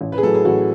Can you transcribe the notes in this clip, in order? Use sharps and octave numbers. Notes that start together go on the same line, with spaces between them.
A1
B4
G#4
A2 F#3 A4
G#4
A1 F#4